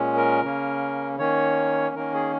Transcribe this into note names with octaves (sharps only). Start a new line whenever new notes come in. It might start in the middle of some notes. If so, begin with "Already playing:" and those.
Already playing: A#2 G#3 C#4
A#4
C#3 A#3 C#4
D#3 A#3 C#4 C#5
D#3 A#3 C#4 A#4
G#4